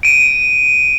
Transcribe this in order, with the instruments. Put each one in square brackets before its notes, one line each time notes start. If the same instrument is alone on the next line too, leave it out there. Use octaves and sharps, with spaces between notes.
[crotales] D7 D#7